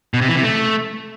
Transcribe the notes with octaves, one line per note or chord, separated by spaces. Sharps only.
B2
C3
E3
C3
A3